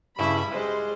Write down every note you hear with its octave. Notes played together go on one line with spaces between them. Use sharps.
G2 C#3 G3 E4 B5
G3 G#3 B4 C5